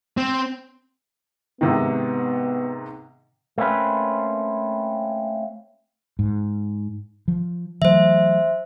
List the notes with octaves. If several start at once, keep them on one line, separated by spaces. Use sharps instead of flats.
C4
G#2 C3 D#3 B3
A3 A#3 C4 C#4 B4
G#2
F3
E3 F#3 A3 C5 E5